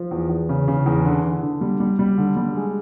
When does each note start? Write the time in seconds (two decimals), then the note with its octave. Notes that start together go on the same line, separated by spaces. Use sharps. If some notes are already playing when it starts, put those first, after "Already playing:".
Already playing: F3
0.11 E2
0.29 E2
0.49 C#3
0.68 C#3
0.86 E2
1.05 D3
1.24 D3
1.42 D3
1.61 G3
1.80 G3
1.99 G3
2.18 D3
2.36 G3
2.56 G#3